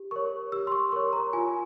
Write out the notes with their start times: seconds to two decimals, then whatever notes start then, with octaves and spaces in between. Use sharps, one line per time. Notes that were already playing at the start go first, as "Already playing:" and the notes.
Already playing: G4
0.11 A#4 C#5 C#6
0.52 G4 E6
0.67 C6
0.72 C#6
0.92 A#4 C#5 C#6
1.13 A#5
1.33 F4 G#5